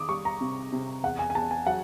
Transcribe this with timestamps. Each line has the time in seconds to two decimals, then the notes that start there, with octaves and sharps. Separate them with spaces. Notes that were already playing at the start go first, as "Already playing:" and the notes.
Already playing: D#3 D6 D#6
0.09 G3 C#6
0.25 A#5
0.41 C3
0.73 C3
1.03 E2 F#5
1.19 G#5
1.30 G#5
1.35 E2 A5
1.51 G#5
1.67 F#3 F#5